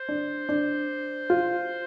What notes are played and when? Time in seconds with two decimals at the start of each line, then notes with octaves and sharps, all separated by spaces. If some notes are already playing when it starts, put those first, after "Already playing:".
Already playing: C5
0.09 D4
0.49 D4
1.30 F4